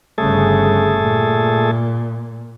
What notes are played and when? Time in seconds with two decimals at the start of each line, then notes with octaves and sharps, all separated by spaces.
0.18 G1 C#3 A3 G#4 A4
1.01 A#2